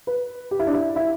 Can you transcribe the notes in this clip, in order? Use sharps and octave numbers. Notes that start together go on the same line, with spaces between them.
B4
G4
E4
D4
E4
E4